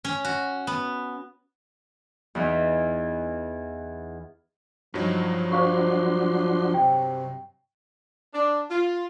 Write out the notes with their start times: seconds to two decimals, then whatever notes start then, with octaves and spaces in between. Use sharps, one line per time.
0.05 C#4
0.25 F#4
0.67 B3
2.35 E2 E3 D#4
4.94 G2 F3 F#3 D#4
5.52 D4 F#4 C5 F5 C6 C#6
6.74 C3 G5
8.34 D4
8.71 F4